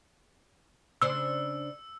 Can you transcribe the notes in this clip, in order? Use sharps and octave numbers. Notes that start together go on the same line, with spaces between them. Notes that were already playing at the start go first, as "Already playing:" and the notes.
C#3 D4 C5 E6